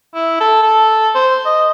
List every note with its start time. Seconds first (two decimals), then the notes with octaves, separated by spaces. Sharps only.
0.14 E4
0.41 A4
0.62 A4
1.15 C5
1.45 D#5